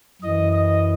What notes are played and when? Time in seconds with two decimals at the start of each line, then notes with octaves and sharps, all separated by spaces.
0.22 F#2 E3 D#5
0.52 D#5